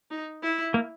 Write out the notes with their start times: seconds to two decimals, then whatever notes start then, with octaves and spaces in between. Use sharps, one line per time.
0.11 D#4
0.42 E4
0.74 A#3